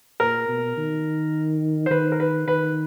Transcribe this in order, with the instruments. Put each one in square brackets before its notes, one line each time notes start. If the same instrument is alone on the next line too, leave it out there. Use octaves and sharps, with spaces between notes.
[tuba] A#2 [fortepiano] A#4
[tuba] B2
D#3
[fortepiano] C5
[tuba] D#3 [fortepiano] B4
[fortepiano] A#4
B4
[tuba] D#3 [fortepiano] B4